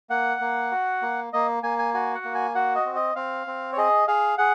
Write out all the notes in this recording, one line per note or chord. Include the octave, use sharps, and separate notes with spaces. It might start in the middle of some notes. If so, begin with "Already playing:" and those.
A#3 F#5
A#3
F#4
A#3
A#3 D#5
A#3 G#5
G#5
F#4 G#5
F#5
A#3
G#5
F#4 F#5
D#5
C4
D#5
C4 F5
C4
C#5
G#4 D#5
G#4 F5
G#4 F#5